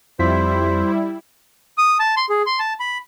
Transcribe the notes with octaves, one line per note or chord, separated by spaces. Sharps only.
F2 G3 E4 C5 B6
D#6
A5
C6
G#4
C6
A5
B5